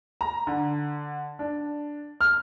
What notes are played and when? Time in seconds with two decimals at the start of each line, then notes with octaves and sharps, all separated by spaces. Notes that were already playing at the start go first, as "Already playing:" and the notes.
0.21 A#5
0.47 D3
1.39 D4
2.21 F6